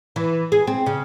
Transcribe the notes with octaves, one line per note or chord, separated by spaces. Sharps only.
E3
G#4
C4
C#3